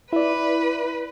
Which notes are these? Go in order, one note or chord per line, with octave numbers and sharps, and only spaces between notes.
E4 B4 D5